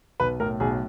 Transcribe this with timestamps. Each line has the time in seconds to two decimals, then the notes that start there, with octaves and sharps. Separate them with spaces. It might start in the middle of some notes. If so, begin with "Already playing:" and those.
0.20 B1 B4
0.40 A2 A#4
0.60 B1 G#4